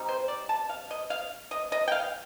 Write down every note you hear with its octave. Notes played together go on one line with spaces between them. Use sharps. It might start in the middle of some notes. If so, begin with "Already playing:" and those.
Already playing: G3 C4 D#4
C5
D5
A5
F5
D#5
F5
D#5
D#5
G5
F5